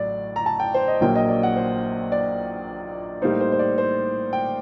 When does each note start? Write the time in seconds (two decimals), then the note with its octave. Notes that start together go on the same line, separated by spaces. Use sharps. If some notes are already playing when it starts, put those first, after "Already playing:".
Already playing: A1 A2 F#3 D5
0.36 A#5
0.46 A5
0.60 G5
0.74 C5
0.88 D#5
1.01 A#1 A#2 F#3 A#3 G5
1.15 D#5
1.28 D5
1.43 F#5
1.56 C5
2.12 D5
3.22 A2 G3 A#3 D#4 C5
3.41 C5
3.52 C5
3.59 D5
3.78 C5
4.33 G5